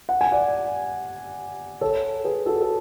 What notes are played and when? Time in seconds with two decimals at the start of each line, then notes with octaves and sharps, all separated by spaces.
0.09 F#5
0.21 G#5
0.32 D5 F#5
1.81 A4 C#5
2.24 G#4 B4
2.46 F#4 A4
2.61 A4